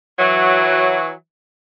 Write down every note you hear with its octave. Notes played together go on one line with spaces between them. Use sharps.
E3 F#3